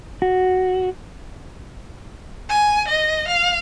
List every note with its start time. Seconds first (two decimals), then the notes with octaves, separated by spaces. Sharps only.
0.22 F#4
2.50 G#5
2.88 D#5
3.28 F5